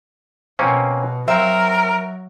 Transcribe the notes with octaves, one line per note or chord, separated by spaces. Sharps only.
B2 A#3 C4 C#4
F#3 C4 A#4 E5